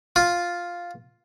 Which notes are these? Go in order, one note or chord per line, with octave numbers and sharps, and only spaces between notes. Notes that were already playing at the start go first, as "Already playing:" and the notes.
F4